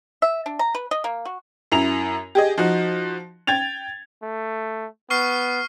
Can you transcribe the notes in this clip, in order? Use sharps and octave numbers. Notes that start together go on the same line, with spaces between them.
E5
D4
A#5
B4
D#5
A#3
F#4
F#2 E4 A#5 F7
G4 G#4 D#5
F3 D#4 F#4
G5 G#6 A6 F7
A3
B3 C#6 F6 C7